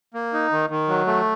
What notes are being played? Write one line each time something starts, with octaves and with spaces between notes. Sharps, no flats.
A#3
D#4
D#3
D#3
F#3
A3